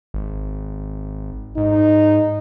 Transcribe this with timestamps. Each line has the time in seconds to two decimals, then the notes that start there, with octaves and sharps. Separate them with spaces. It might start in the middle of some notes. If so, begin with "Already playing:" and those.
0.14 G#1
1.57 G#2 D#4